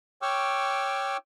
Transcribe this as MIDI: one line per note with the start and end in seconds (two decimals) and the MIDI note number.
0.22 1.17 73
0.22 1.17 79
0.22 1.17 85
0.22 1.17 86
0.22 1.17 88
0.22 1.17 89